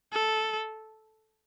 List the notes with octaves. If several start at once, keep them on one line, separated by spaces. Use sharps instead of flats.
A4